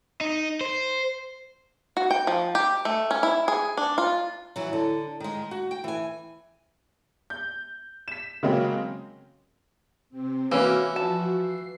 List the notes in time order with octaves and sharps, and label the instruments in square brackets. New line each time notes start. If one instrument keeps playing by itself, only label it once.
[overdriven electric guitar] D#4
C5
[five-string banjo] F#4
G5
F3
G4
A3
C#4
E4
G#4
D4
F4
[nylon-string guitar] E3 F#3
D3
D#3 G#3
F#4
G5
E3 G#5
[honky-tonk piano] G6
B6 E7
C#3 F#3 G#3 A#3 C4 C#4
[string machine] C3 C4
[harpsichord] E3 [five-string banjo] A#3 C#4 [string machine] F#4
[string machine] F3 F#4 [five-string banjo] A5
[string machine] C7